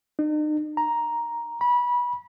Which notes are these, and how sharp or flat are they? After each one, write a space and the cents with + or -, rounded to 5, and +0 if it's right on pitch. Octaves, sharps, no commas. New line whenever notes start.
D#4 -40
A#5 +5
B5 -25